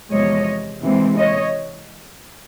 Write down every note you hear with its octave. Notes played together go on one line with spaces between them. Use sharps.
E2 C3 F3 G#3 C#5 D#5
C3 E3 G#3 C4
C#5 D#5